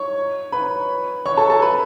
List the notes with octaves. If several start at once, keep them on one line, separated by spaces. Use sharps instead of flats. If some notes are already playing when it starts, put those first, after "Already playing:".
Already playing: C#5 C#6
B4 B5
C#5 C#6
A4 A5
A4 A5
B4 B5